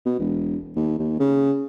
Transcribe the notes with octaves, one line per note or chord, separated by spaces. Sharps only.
B2
E1
D#2
D#2
C#3